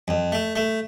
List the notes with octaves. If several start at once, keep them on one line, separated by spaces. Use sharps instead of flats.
F2
A3
A3